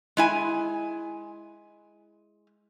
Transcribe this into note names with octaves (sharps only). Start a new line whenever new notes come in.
G#3 E4 G#5